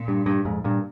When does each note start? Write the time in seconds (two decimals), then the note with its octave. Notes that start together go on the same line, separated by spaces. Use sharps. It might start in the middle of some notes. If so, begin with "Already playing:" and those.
Already playing: A#2
0.08 G2
0.26 G2
0.45 F2 G#2
0.64 G2 A#2